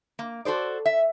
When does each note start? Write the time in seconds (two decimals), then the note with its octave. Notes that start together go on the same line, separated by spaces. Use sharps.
0.19 A#3
0.45 F#4 A4 C5 D5
0.86 E5